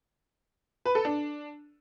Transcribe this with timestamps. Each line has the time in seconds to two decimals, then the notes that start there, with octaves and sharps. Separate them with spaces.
0.85 B4
0.95 A4
1.05 D4